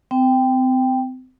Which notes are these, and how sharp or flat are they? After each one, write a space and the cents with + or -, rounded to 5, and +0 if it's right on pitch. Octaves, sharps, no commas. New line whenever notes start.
C4 -35 G5 +0